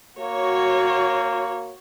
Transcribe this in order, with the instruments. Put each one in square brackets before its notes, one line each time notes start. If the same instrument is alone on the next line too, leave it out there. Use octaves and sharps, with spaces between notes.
[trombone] A#3 [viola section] F#4 C#5